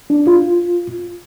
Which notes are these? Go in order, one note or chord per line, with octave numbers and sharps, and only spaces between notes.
D4
F4